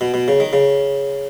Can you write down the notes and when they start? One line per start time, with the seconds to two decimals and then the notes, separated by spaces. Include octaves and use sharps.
0.01 B2
0.14 B2
0.28 C#3
0.40 D#3
0.53 C#3